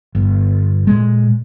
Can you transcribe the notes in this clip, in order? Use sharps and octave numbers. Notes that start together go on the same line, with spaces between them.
G1
A#2 G#3